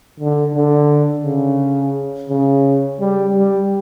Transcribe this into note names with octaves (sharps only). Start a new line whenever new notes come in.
D3
D3
C#3
C#3
G3
G3